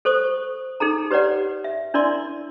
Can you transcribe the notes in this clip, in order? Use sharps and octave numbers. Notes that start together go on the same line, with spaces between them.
A4 C5 C#6 D#6
D#4 G#4 A4 A#5
G4 B4 C#5 D5 F#5
E5
D4 E4 A#4 D5 C6